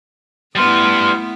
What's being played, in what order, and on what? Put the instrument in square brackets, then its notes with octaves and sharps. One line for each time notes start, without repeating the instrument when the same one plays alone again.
[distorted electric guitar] G3 B4 [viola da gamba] A3 B3 E4 [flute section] C6 D#6 F6